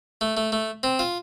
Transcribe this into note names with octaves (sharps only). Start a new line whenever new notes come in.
A3
A3
A3
C4
F4